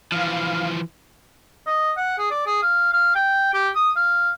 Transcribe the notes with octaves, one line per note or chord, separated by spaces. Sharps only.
E3 F3 F5
D#5
F#5
G#4
D5
G#4
F5
F5
G5
G4
D#6
F5